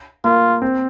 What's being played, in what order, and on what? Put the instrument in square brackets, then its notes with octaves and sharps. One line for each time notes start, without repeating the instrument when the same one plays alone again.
[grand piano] A#3 [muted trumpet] F4
[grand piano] C4